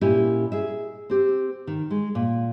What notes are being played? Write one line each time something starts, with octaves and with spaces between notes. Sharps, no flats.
A#2 C#4 E4 G4 G#5
G#4 E5
C4 G4
D#3
G#3
A#2